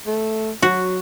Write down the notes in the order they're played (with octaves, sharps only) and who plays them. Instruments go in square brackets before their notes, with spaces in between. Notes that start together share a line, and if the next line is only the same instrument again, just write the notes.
[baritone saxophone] A3
[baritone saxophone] F#3 [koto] F#4